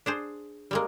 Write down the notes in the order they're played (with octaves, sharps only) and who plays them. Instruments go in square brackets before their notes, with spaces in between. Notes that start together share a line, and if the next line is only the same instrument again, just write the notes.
[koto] D4 G#4 C5
G3 G#3 A#3